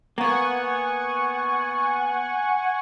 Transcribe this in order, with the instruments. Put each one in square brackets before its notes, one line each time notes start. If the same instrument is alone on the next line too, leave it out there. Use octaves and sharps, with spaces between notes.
[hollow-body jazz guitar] A#3 B3 [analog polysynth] F#5 G#5 C#6